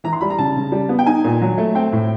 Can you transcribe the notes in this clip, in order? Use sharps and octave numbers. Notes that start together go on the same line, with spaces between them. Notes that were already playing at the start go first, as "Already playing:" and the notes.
E3 A#5
C6
G3 B5
A#5
C#3 A5
C#3
G3
B3
G5
D#4 G#5
A#2
F#3
A3
C4 G5
A2